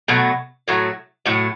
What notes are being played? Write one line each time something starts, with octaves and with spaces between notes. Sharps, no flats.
B2 F#3 A3
A2 F#3 A3
A2 F#3 A3